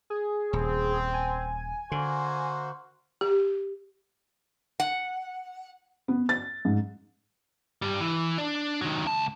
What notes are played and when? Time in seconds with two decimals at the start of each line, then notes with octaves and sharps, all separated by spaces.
0.10 G#4
0.53 D#1 C4
1.14 G#5
1.92 D3 A#3 F#4 C5
3.21 G4
4.80 F#5
6.08 B3
6.29 A6
6.65 G#2
7.82 G2 G3
8.01 E3
8.38 D4
8.81 D#3 F#3
9.05 C#2 A5